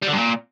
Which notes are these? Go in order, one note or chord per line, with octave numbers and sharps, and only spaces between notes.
G3
D3
G2
A#2